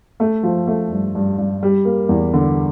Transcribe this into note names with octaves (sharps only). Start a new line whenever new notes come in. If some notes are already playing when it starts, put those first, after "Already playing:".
A3
F3
A3
G2
G2
G2
G3
A#3
E2
D3